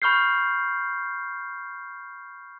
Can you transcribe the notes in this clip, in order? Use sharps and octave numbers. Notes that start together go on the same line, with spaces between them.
B5 C#6 F6 G6 C7